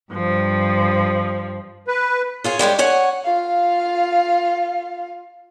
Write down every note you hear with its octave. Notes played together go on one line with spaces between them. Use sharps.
G2 F3
B4
F4 G#4 C#5
G3 G#3 C5 C#5
C#5 F#5 G#5
F4 F5